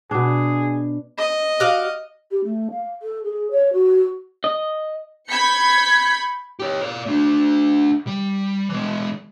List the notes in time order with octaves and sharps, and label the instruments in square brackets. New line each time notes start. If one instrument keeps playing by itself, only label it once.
[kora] B2 D4 [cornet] G#4
[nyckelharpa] D#5
[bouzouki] F#4 D5 F5
[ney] G4
A3
F5
A4
G#4
C#5
F#4
[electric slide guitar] D#5
[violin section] B5 G6 G#6 B6 C#7
[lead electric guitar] G4 C#5
A#4 D5
A3 D4
G3
E3 G#3